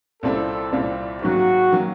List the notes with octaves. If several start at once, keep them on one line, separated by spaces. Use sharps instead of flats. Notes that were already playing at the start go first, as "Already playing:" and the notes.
C2 A#2 G3 C4 E4 A4
C2 A#2 G3 C4 E4
G#2 D#3 F#3 A#3 F#4
D#3 F#3 A#3